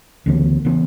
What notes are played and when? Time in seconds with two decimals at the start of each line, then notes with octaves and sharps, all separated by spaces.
0.26 D2 C#3 E3 B3
0.65 C#3 E3 B3